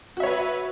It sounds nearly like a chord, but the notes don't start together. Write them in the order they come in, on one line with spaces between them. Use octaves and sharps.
F#4 E5 C#5 B4